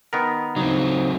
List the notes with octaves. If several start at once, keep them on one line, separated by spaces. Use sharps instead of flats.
D#3 B3 A#4
C#2 F#3 C4 D#4